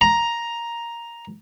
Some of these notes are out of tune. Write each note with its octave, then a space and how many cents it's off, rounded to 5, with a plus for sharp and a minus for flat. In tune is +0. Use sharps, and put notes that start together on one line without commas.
A#5 +5